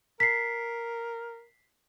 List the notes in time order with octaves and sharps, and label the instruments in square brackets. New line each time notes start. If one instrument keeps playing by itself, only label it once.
[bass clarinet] A#4 [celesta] B6 C7